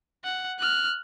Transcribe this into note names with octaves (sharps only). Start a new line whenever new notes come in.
F#5
F6 F#6